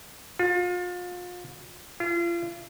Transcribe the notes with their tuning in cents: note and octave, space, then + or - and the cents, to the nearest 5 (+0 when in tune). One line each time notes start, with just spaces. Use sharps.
F4 +35
F4 -35